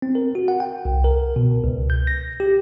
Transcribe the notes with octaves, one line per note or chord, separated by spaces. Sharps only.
C4
A#4
F#4
F#5
G5
C2
A#4
B2
C#2
G6
A#6
G4